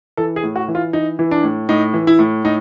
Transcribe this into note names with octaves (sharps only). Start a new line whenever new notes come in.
E3 A4
G#4
A2
F#4
E3
F4
E3 D#4
E3
D4
A2
A2 D#4
E3
E4
A2
A2 D#4